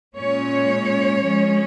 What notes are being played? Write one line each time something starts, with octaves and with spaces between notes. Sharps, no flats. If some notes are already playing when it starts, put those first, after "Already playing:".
A#2 G#3 C#4 C#5
F3 G#3 C#4